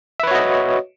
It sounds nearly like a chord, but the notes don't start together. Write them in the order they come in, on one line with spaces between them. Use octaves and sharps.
E5 B4 C#5 F#4 D#5